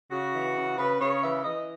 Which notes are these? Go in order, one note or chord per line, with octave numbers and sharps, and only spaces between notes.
C#3 F#4
E3
C#3
C#3 B4
C#3 C#5
E3 E5
E3 D#5